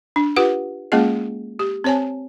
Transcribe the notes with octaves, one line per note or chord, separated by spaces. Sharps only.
D4
F4 G4 B4 F#5
G#3 A#3 C#4 F4 G#4 D#5
G4
C4 C5 C#5 G#5 A5